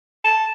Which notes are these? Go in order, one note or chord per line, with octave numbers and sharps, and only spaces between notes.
A5